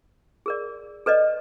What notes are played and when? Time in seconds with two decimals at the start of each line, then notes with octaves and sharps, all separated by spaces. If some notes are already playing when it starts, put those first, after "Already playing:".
0.46 G#4 A#4 D5
1.06 A4 B4 D5 D#5